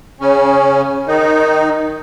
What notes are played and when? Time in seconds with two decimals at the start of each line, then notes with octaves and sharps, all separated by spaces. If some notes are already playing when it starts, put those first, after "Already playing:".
0.20 C#3 C#4
1.08 D#3 D#4